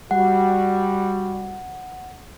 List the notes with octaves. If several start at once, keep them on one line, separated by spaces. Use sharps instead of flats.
G3 F#4 F#5